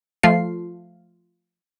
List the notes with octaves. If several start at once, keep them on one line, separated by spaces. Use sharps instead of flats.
F3 A3 F4 C7